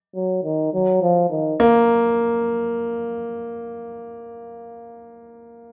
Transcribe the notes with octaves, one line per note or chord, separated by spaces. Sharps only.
F#3
D#3
F#3
F3
D#3
A#3